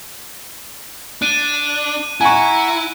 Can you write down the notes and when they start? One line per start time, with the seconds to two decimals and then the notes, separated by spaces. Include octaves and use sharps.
1.22 D4 F#6 D#7
2.21 E4 F#5 G#5 A#5 C#6